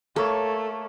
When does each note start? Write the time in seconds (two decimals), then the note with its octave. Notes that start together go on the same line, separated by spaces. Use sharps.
0.16 A3 A#3 A4 C#5